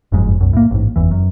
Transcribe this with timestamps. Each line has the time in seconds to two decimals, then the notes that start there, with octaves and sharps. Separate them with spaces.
0.12 F#1 F2 G#2
0.41 B1 F#2
0.53 A2 A#3
0.71 A1 G#2
0.96 F#1 E2 E3
1.11 F#2